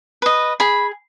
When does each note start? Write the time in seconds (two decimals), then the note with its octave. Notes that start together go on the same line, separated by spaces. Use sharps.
0.22 B4 D#5
0.60 G#4 B5